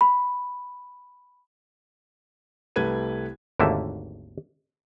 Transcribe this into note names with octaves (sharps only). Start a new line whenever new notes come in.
B5
C2 A3 G4 B4 G#6 D#7
G#1 D#2 D3 A3 A#3 E5